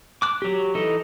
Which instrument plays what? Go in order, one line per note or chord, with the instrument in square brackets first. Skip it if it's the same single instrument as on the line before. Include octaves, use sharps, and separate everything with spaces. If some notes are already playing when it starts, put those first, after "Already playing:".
[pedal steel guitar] D6 F#6
F#3 G4
E3 D#4 A4 D#5